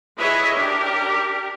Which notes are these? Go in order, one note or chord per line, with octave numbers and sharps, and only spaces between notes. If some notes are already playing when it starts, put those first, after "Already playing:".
E4 G#4 B4 C#5 D#5 E5
D4 G4 A#4